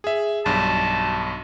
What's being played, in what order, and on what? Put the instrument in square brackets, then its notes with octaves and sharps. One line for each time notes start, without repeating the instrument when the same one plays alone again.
[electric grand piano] G#4 E5
[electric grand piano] B1 G2 [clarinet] A5